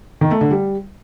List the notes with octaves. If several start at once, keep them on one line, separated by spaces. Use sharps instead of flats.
D#3
A3
D3
G3